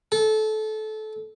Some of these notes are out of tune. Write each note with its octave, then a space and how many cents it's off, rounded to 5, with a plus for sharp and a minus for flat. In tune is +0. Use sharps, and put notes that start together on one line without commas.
A4 -25